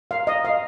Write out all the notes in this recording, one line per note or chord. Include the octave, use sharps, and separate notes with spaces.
F5
D#5
F5